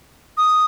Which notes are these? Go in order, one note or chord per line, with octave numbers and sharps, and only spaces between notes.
D#6